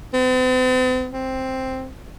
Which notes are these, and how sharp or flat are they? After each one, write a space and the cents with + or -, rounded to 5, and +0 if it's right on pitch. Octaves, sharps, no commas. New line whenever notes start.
C4 -45
C4 +0